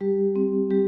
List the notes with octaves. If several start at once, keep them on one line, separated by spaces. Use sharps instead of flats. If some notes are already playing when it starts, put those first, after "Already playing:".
G3 G4
C4
G3 G4